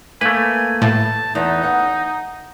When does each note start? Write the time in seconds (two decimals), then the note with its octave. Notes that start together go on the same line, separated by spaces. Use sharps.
0.21 A3 A#3 B4 G#5
0.82 A2 A5
1.35 E2 D#4
1.63 F#5